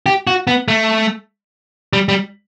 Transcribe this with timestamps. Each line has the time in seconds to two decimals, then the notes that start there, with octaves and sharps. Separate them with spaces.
0.06 G4
0.27 F#4
0.47 B3
0.68 A3
1.93 G3
2.09 G3